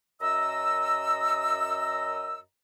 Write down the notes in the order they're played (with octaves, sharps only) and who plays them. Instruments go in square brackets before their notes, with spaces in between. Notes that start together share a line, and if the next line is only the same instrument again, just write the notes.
[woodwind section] F#2 D#5 A#5 E6